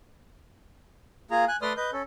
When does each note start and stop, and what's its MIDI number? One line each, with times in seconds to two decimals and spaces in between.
1.31 1.45 58
1.31 1.45 65
1.31 1.45 68
1.31 1.45 82
1.48 1.57 80
1.48 1.57 90
1.62 1.73 57
1.62 1.73 71
1.62 1.73 74
1.62 1.73 84
1.62 1.73 87
1.62 1.73 89
1.77 1.91 71
1.77 1.91 75
1.77 1.91 91
1.93 2.02 61
1.93 2.02 69